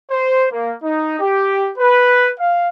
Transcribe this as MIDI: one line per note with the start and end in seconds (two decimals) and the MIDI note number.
0.10 0.45 72
0.51 0.73 58
0.82 1.16 63
1.20 1.70 67
1.77 2.31 71
2.38 2.68 77